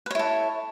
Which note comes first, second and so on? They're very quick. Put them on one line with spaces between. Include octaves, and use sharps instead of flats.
B4 C#5 E4 A4